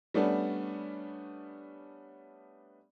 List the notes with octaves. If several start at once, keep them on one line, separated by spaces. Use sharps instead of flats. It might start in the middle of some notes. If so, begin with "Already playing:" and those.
G3 A3 B3 C#4 D4